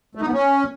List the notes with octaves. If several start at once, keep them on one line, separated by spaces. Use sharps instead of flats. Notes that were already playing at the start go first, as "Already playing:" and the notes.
A3
D#4
B3
C#4